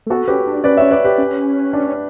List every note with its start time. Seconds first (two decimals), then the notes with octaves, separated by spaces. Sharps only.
0.07 A3
0.10 B3 F#4 A4
0.28 C#4 G4 B4
0.47 D4
0.64 C#4 B4 D5
0.77 C#4 C#5 E5
0.91 B4 D5
1.04 G4 B4
1.18 C#4
1.73 D4